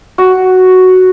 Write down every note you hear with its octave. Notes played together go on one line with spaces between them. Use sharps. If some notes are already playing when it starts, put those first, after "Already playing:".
F#4